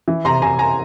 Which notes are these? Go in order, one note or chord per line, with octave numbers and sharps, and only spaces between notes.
E3
C3 A#5 C6
C3 G#5 A#5
G#5 A#5